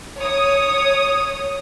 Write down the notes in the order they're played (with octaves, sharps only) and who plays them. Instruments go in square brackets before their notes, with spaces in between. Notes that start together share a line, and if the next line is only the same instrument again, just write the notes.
[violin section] C#5 D#6